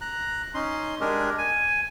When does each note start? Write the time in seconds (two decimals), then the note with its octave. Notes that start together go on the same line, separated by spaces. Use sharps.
0.01 A#5 F#6
0.54 C#4 D#4 C6
1.01 G#3 D4 G4 G#4 A#4
1.38 G#5